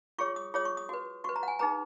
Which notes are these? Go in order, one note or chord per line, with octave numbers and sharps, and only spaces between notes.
F4 G#4 C#5 C#6
D#6
F4 G#4 C#5 D#6
C#6
D#6
F#4 B4
F#4 B4 C#6
A#5
F#5
G#5
D#4 G#4 B4 A#5